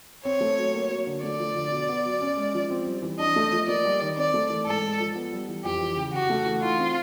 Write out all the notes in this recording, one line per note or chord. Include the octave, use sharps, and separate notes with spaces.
C4 C#5
A3
F#3
A#3
F#3
D3
A3 D5
F3
D3
B2
B3
F#3
C#4
G#3
F3
C4
G3
E3
D4 D#5
A3
F3
A#3 D5
G3
D#3
C4 D5
A3
E3
G#2 A4
G#3
F3
B3
G3
E3
F2 G4
E3
C#3
C#3 F#4
A3
E3
D#4 F4
C4